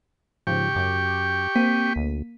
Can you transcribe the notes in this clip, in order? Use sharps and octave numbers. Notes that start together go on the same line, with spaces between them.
G#2 C#3 F3 G4 G5 C#6
F#2 D6 G6
A#3 C4 B6 D#7
D2